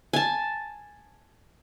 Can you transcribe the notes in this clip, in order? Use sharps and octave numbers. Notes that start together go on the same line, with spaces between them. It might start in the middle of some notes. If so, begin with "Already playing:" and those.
G#5 A5